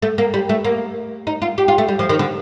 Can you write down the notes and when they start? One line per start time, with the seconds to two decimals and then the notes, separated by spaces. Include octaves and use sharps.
0.02 A3
0.18 A#3
0.34 G3
0.49 A3
0.65 A#3
1.27 D#4
1.42 F4
1.58 G4
1.68 F4
1.78 A3
1.88 G3
1.99 F3
2.09 D#3
2.19 D3